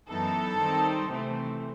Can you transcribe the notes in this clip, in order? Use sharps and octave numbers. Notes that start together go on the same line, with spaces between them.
F#2 E3 B3 D#4 A4
D#3 G3 C4 D#4
C3 E3 A3 C4